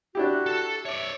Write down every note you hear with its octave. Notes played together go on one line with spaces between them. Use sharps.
D4 E4 F#4 G4
A4
C#5 D5 E5